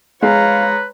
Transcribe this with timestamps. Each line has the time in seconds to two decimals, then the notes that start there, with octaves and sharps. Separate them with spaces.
0.22 G#3 B4 C#5 F5 A#5